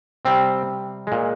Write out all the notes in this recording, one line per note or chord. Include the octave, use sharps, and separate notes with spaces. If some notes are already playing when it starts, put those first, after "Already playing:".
C3 G3 C4
A#2 G#3